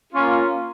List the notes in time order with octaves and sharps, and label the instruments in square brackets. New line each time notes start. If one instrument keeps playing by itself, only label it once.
[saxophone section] A#3 C#4 F4